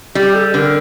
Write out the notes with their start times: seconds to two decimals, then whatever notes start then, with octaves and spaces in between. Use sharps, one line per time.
0.15 G3 G4
0.35 A4
0.54 D3 B4
0.58 A#4